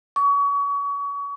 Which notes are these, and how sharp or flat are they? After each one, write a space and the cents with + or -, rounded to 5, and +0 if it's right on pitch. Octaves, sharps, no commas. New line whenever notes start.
C#6 +35